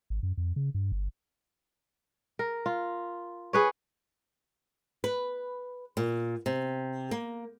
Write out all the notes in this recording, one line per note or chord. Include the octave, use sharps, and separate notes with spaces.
G#1
F#2
F2
C#3
G2
G1
A#4
F4
G#4 B4 C#5
B4
A#2
C3
A#3